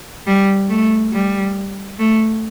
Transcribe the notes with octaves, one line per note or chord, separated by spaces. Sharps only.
G3
A3
G3
A3